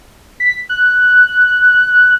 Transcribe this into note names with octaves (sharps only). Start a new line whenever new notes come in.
B6
F#6